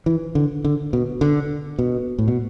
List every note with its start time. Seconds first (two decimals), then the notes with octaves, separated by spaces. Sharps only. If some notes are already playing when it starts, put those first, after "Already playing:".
0.06 E3
0.35 D3
0.65 D3
0.93 B2
1.21 D3
1.79 B2
2.18 A2
2.28 B2